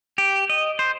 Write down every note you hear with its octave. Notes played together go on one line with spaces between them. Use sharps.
G4
D#5
C5